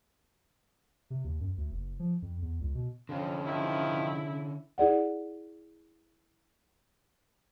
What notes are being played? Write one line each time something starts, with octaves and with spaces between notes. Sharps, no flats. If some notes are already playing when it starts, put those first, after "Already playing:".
C3
D#2
F#2
D2
F#1
F3
F2
E2
C#2
B2
F2 D3 C#4
C3 D#3 F3 E4
E4 G#4 D5 F#5